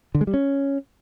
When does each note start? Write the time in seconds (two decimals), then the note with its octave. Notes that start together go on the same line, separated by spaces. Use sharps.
0.15 D3
0.21 G#3
0.27 G3
0.34 C#4